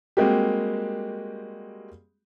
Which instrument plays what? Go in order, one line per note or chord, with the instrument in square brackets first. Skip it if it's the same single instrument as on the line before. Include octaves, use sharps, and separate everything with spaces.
[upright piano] G3 G#3 A#3 C4 F#4 G4